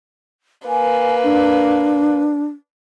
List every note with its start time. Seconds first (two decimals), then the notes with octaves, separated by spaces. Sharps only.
0.68 A#3 B4 G#5
1.23 D4